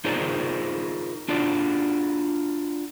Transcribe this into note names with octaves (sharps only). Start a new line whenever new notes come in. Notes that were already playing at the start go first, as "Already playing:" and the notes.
D#4 F4 G#4 A#4 C5 D5
D4 F4 F#4 D5